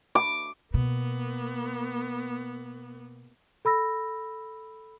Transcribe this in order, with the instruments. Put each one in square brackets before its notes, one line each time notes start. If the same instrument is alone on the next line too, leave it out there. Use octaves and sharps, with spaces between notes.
[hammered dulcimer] D6
[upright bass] B2 [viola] A#3 B3
[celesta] A4 B5 E6 A#6